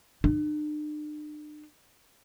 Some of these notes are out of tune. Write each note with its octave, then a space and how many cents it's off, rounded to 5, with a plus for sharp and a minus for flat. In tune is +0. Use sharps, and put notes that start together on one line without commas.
D4 +45